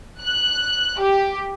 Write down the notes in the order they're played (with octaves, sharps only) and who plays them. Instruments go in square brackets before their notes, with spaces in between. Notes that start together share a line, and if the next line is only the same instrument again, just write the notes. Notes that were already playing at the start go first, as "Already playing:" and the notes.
[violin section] F#6
G4